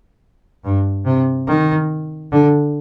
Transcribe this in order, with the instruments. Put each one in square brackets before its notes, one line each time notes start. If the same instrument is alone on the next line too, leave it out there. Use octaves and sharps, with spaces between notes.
[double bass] G2
C3
D#3
D3